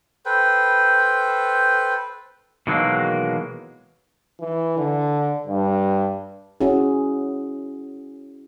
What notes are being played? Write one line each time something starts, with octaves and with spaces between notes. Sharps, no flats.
A4 B4 C5 G5
B2 D#3 E3 F#3 G#3 A#3
E3
D3
G2
C#4 E4 F#4 G#4